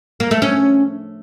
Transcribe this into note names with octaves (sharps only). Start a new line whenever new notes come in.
A#3
A3
C#4